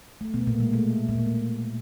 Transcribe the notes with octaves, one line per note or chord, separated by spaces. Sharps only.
A3
B2 B3
A3
A#2 A#3
G#3
A3
A#2 A#3
A3